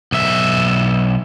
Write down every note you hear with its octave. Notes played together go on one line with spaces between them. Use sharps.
B1 E5